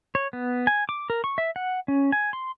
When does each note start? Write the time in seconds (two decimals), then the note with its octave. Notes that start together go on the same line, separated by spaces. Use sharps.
0.15 C#5
0.33 B3
0.67 G#5
0.89 D6
1.10 A#4
1.24 C#6
1.38 E5
1.56 F#5
1.88 C#4
2.12 G#5
2.33 C6